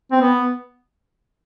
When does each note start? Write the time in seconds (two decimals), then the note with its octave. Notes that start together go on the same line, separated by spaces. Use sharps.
0.12 C4
0.21 B3